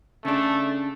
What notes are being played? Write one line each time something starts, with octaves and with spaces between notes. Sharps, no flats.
C#3 A3 D4